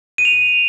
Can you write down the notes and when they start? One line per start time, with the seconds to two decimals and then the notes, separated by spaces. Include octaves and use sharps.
0.18 D#7
0.25 F7